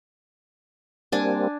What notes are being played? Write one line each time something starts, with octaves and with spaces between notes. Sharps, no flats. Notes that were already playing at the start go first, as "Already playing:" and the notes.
G3 A#3 C4 D4 G#5